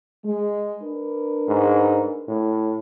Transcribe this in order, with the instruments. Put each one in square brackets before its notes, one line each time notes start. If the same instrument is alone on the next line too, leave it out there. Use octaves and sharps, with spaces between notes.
[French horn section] G#3
D4 A#4 B4
[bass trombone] G#2
A2